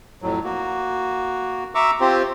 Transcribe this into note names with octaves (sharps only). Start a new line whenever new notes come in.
F2 A2 F#3
A#3 F#4
E5 A#5 C#6 D6 E6
C4 F4 G4 C5